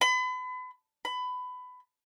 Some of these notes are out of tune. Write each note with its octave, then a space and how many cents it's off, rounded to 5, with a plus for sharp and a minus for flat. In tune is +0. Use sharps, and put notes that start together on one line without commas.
B5 +35
B5 +20